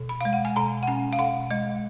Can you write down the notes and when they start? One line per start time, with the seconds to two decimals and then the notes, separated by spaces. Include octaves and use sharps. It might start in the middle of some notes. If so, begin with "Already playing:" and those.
Already playing: B2
0.09 B5
0.21 G#3 F5
0.33 F#5
0.45 G#5
0.56 B2 A#5
0.83 F#5
0.87 C#4 G#5
1.13 F5
1.19 B2 F#5
1.51 G#3 D#5